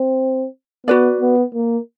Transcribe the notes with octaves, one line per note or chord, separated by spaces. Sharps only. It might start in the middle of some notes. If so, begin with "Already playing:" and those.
Already playing: C4
B3 F#4 B4 D5
B3
A#3